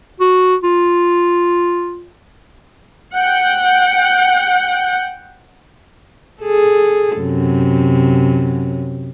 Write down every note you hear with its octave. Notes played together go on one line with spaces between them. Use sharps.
F#4
F4
F#5 G5
G#4 A4
F#2 C3